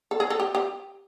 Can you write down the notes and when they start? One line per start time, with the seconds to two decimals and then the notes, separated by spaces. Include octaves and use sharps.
0.11 A4
0.20 G#4
0.30 A4
0.40 G4
0.55 G4